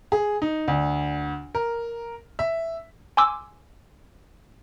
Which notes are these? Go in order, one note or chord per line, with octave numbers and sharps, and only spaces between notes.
G#4
D#4
D2
A#4
E5
G#5 C6 D6 E6